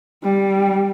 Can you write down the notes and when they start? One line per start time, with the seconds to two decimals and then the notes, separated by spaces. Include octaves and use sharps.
0.23 G3